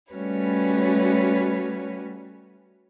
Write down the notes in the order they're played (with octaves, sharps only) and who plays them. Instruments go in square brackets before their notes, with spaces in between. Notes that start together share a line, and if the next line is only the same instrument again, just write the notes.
[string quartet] G3 A3 C#4 F#4 B4 C#5